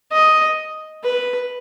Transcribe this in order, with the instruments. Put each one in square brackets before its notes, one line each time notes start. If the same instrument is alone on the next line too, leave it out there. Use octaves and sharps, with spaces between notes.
[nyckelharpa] D#5
B4